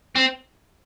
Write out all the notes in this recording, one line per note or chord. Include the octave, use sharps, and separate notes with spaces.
C4